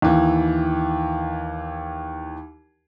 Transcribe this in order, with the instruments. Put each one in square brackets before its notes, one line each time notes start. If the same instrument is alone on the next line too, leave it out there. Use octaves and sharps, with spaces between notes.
[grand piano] D#2 E3